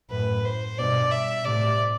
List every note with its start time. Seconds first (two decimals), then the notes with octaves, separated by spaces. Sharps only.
0.11 F#2 A2 B4
0.45 C5
0.78 G2 B2 D5
1.11 E5
1.44 A2 C3 D5